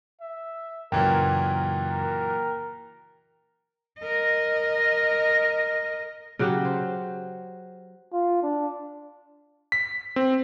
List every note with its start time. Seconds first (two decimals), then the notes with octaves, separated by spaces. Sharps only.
0.21 E5
0.92 F#2 A#2 C#3 E3 F#3 A#4 G5
1.89 A#4
3.99 A#4 D#5
6.39 C#3 F#3 F#4 G4
6.65 C5
8.13 F4
8.43 D4
9.72 B6
10.16 C4